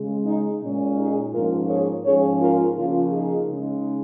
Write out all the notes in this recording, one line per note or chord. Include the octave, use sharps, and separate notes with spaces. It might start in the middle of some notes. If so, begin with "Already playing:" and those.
Already playing: C#3 G#3
D#4
A#2 G#3 C#4
D#4 G#4
G#2 F3 A#3 C#4 F4 A#4
G#4 C#5
G#2 F3 C#4 G#4 C#5
F4 A#4
C#3 F3 A#3 C#4 F4
D#4 G#4
C#3 G#3 D#4